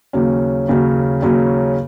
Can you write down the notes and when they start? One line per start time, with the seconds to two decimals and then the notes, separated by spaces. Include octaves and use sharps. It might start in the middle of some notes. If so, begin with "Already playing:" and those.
0.13 D#2 C#3 F#3 C#4
0.68 D#2 C#3 F#3 C#4
1.22 D#2 C#3 F#3 C#4